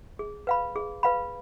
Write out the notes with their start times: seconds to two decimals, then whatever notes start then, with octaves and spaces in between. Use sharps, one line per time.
0.19 G#4
0.47 B4 F5 B5
0.76 G#4
1.03 B4 F5 B5